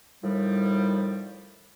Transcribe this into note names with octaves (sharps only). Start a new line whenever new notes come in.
A2 D#3 F3 G3